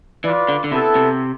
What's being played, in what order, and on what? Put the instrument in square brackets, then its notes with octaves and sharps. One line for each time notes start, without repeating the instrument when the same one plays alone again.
[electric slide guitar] E3 [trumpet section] F4 B4 D5
[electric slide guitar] D3
D3
[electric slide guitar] C3 [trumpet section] B3 E4 A4
[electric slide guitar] C3